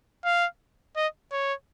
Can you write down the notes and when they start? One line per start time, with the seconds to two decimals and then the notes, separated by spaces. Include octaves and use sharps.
0.25 F5
0.96 D#5
1.32 C#5